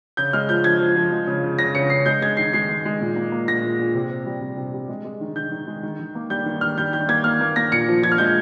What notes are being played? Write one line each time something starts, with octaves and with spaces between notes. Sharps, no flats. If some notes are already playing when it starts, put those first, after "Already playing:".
C#3 G6
G#3 F6
F3 G6
F3 G#6
F3
F3
G#3
C#3
C#3
C#3 A#6
C#3 C#7
C#3 C7
G#3 G6
G#3 G#6
D#3 C7
G#3 C7
G#3
G#3
A#2
A#3
A#3
A#2 A#6
A#2
A#2
C3
C3
G3
C3
C3
G3
G#3
G#3
D#3
D#3 G6
D#3
G#3
D#3
D#3
A#3
G3 G6
D#3
D#3 F6
G3 G6
D#3 G6
A#3 G#6
A#3 F6
A#3
A#3 A#6
A#2 C#7
F3
F3 G#6
F6
G#3 G6